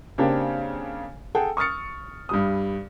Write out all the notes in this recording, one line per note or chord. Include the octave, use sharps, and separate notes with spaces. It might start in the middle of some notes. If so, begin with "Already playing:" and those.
C#3 A#3 C4 D4 G4
G#4 A4 F#5 G5
C#6 D#6 F6 A6 C#7
G2 G3 D#6